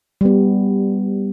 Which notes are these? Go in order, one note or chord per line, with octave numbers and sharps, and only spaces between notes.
G3 B3